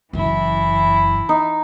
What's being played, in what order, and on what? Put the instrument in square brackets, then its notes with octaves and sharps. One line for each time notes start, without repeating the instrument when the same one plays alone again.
[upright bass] F#1 F#2 [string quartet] E3 E4
[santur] D#4